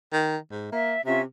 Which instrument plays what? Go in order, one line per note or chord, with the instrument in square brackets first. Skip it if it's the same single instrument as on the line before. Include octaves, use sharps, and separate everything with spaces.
[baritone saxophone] D#3
G#2
[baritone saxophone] A#3 [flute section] E5
[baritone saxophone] C3 [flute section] C#4 F4 E5